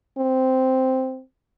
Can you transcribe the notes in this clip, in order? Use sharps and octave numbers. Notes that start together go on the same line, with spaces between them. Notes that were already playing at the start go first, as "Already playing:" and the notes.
C4